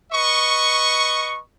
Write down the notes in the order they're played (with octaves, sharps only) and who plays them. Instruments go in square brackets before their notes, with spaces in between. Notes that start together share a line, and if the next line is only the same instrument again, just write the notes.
[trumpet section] B4 D#5 C#6